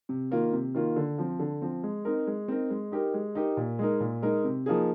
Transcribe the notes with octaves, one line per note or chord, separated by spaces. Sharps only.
C3
D#3 A#3 F4
C3
D#3 A#3 F4
D3
F3 C4
D3
F3 C4
G#3
C4 D#4 A#4
G#3
C4 D#4 A#4
G#3
D#4 G4 A#4
G#3
D#4 G4 A#4
A#2
G#3 D#4 A#4
A#2
G#3 D#4 A#4
C3
F3 A#3 D#4 G#4